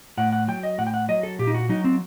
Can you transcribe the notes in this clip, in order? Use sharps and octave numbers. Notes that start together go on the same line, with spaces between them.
A2 F#5
F#5
F#3 G5
D#5
A2 F#5
G5
F#5
F#3 D#5
A4
A#2 G4
D#4
F#4
F#3 D#4
C4